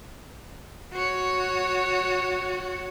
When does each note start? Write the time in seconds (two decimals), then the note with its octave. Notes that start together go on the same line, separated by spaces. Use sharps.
0.93 F#4 C#5